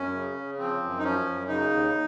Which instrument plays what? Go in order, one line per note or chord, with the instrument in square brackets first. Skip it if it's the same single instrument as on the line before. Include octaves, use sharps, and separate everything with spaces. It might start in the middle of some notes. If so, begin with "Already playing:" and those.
Already playing: [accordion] F#2 C#4
C#3
C#3
F3 C4
F#2
D#4
F3 C#4
F#2
C#3 D#4
D#2